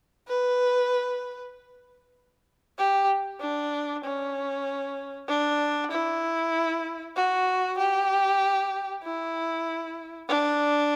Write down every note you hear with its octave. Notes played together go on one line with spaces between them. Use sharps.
B4
G4
D4
C#4
D4
E4
F#4
G4
E4
D4